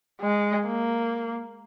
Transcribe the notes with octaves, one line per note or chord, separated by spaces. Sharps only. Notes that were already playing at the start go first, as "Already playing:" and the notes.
G#3
A#3